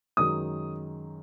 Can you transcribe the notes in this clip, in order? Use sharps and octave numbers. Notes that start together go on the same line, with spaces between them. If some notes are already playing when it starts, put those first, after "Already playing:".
F#2 D#3 G#3 D#6